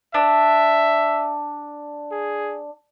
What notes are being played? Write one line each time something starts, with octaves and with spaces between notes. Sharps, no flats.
D4 E5
G#4